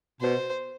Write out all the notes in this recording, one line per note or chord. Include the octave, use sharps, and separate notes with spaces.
B2 C5